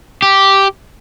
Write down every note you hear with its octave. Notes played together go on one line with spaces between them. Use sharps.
G4